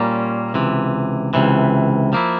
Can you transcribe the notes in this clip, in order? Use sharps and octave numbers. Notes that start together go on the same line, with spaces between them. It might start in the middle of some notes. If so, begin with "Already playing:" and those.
Already playing: A#2 G3 A#3 C#4
C#2 C3 E3
C#2 C3 E3
F3 A#3 E4